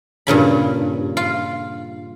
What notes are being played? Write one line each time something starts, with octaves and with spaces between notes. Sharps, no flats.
G2 A#2 C#3 B5
F4